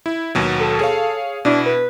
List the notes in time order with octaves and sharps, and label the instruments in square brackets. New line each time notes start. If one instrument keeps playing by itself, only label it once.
[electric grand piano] E4
D#2 B2 F#3
[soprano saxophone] A4
[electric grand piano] G#4 C#5 F5
[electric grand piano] B2 E4 [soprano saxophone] D4
[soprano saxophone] B4